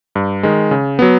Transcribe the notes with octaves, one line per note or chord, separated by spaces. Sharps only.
G2
D#3 G#3
C#3
F#3 B3